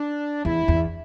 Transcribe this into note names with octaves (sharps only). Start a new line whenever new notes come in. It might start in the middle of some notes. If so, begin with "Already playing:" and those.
Already playing: D4
E2 E4
E2